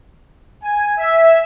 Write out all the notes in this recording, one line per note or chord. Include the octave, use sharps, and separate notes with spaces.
G#5
E5